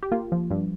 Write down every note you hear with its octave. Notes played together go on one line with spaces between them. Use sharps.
G4
A#3 F4
F3
G2